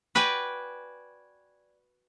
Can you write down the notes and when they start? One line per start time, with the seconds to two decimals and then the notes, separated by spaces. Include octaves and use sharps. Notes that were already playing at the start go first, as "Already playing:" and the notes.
0.15 F#4 B4 D5 G5 G#5